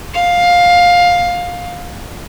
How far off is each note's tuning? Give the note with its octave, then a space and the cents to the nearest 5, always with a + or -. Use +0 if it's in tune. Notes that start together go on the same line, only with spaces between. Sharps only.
F5 +15